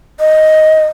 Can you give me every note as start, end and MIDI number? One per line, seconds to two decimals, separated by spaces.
0.20 0.85 75